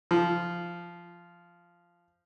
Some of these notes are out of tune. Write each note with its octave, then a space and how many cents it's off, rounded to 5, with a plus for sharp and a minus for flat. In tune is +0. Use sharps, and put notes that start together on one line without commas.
F3 -10